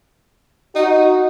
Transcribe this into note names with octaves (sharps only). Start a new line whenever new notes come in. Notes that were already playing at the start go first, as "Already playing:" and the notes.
D#4 F#4